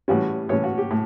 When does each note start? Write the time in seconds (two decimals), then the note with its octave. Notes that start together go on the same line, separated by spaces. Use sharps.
0.08 A2 E3 G3 C#4 F#4
0.49 A2 E3 G3 C#4 C#5
0.64 F#4
0.78 G4
0.91 A2